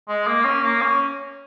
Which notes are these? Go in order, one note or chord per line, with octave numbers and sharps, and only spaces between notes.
G#3
A#3
C#4
A#3
C#4